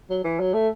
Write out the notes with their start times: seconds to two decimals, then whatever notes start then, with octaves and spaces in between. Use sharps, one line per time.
0.10 F#3
0.24 E3
0.40 F#3
0.54 A3